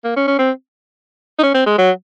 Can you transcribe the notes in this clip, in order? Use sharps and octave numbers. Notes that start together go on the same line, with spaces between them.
A#3
C#4
C#4
C4
D#4
C#4
C4
G#3
F#3